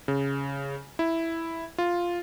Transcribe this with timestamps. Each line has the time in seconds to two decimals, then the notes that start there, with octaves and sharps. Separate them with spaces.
0.08 C#3
0.99 E4
1.78 F4